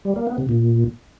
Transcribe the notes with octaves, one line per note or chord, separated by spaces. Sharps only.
G3
A#3
B3
C3
A#2